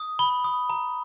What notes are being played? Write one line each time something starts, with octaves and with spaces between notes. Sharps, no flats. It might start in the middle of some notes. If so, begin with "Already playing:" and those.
Already playing: D#6
B5 G7
D#6
A#5